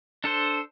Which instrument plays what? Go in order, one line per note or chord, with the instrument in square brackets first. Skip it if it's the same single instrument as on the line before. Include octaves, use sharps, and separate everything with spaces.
[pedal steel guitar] D4 A4 C5